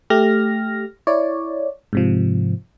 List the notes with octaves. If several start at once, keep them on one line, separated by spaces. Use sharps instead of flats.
A3 G4 F6 A#6
E4 C#5 D5
G#2 C3 F3